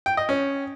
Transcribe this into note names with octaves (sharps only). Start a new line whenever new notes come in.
G5
D#5
C#4